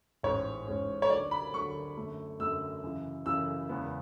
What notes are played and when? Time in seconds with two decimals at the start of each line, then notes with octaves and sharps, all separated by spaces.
0.23 A1 G#2 G#3 C#4 C#5
0.68 A1 G#2 G#3 C#4
1.02 C#5
1.10 D2 D3 F#3 D5
1.31 B5
1.54 D2 D3 F#3 C#6
1.97 F#2 D3 A3
2.40 F#2 D3 A3 E6
2.83 F#2 C#3 E3
3.26 F#2 C#3 E3 E6
3.69 E2 C#3 G#3 B3